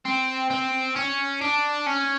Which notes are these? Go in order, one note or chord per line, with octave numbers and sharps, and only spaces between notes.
C4
C4
C#4
D4
C#4